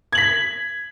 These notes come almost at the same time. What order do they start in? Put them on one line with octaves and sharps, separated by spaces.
G#6 F#7 B6